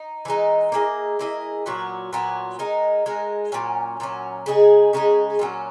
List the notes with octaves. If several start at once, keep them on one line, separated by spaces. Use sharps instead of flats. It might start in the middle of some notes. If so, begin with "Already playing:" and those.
Already playing: D#4
E3 G#3 D#4
A#3 E4 G#4 D#5
A#3 E4 G#4 D#5
A#2 F#3 B3 F#4
A#2 F#3 B3 F#4
G#3 D#4 A#4
G#3 D#4 A#4
A#2 F#3 C#4
A#2 F#3 C#4
C#3 G#3 D#4 G#4
C#3 G#3 D#4 G#4
A#2 F#3 C#4